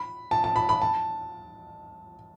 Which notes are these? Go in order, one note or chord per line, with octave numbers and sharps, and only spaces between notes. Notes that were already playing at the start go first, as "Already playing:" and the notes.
Already playing: B5
A5
A5
B5
B5
A5